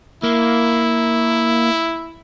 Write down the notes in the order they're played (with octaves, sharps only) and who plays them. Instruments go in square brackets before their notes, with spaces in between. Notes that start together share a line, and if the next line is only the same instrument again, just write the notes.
[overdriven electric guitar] A#3 [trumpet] E4